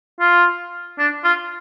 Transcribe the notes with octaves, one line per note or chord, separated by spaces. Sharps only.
F4
D4
F4